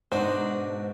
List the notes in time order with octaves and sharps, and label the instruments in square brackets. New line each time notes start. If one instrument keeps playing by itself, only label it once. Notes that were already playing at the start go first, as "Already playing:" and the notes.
[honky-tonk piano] G#2 [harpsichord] B2 F#4 [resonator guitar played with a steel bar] D4 D#4 [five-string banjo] C5